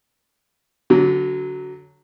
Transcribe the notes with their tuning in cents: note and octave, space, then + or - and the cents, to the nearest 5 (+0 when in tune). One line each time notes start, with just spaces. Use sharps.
D3 -30 F#3 +0